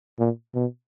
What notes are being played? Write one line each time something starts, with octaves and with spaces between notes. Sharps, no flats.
A#2
B2